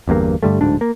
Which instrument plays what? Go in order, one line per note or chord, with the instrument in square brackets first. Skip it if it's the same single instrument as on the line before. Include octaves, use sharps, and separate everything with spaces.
[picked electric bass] G1 E2 G2 A#3
G2 D3 G3 A3
D1 D2 G#2 D4
A#3